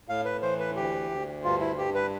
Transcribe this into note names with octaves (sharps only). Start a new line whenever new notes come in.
A2 F5
B4
E3 C5
B4
D2 G4
D2
G2 F4
E4
G2 G4
B4